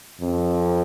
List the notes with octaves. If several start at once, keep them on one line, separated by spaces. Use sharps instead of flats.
F2